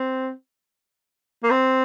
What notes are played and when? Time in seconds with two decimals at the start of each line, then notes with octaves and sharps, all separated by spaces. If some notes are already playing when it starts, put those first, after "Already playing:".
Already playing: C4
1.44 A#3
1.51 C4